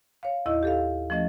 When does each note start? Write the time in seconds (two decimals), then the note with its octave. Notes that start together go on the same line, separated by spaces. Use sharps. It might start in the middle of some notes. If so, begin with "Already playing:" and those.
0.23 C#5 F5
0.46 D#2 A2 E4 D#5 E6
0.63 G4 A4 F5
1.10 F3 A3 C#4 D#5 A6